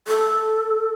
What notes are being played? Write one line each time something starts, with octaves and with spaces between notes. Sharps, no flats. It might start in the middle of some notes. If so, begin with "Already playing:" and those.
A4